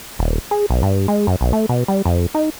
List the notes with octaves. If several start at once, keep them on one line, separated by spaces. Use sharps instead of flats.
D#1
G#4
B1
G2
G#3
F#2
B1
A3
B2
G3
F2
D#4